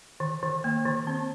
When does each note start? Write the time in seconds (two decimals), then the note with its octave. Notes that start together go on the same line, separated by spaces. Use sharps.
0.20 D#3
0.43 D#3
0.64 A#3
0.86 D#3
1.07 C4